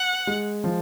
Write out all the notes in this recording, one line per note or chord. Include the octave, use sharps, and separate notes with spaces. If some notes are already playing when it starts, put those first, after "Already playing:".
Already playing: F#5
G#3
F3